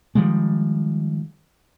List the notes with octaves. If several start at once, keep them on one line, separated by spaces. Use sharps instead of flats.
D#3 F3 G3 G#3